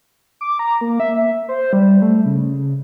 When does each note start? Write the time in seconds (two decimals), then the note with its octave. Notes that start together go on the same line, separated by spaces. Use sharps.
0.41 D6
0.59 A#5
0.81 A#3
1.00 E5
1.49 C5
1.73 G3
2.02 A3
2.25 C#3